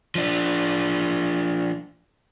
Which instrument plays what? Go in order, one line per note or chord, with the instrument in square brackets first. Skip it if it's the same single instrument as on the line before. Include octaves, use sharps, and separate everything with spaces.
[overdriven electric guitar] F3 D4